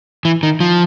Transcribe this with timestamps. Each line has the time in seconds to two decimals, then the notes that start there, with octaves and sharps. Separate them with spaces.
0.25 E3
0.43 D#3
0.60 F3